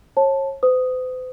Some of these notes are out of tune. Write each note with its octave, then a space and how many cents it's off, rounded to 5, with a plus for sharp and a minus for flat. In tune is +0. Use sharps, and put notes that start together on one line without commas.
C#5 -35 A5 +0
C5 -45 D#6 +0